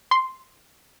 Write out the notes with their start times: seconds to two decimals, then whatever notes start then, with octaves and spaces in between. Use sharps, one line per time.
0.11 C6